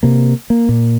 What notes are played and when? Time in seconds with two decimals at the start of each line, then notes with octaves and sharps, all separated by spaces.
0.03 C3 A#3
0.50 A#3
0.69 A#2